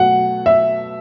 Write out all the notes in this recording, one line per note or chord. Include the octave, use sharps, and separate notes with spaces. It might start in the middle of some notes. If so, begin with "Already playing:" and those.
Already playing: B2 F#3 A3 F#5
E5